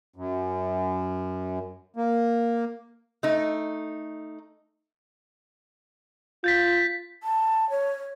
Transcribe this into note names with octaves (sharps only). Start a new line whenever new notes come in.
F#2
A#3
A3 D#4
F4 G6 A6 B6
A5
C#5